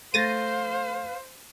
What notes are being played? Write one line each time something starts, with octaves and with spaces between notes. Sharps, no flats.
A3 C5 F5 A6 A#6 D#7